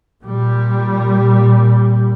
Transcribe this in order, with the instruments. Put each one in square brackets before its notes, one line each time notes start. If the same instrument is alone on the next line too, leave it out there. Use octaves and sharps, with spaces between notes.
[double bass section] A#2 G3